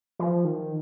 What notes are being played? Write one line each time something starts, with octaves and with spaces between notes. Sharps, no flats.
F3
D#3